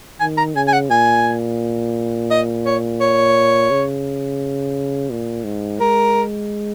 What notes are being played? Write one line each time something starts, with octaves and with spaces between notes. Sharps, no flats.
D#3 G#5
A#5
C#3 G#5
G#5
F#5
A#2 G#5
D#5
C#5
C#5
C#3
A#2
G#2
G#3 A#4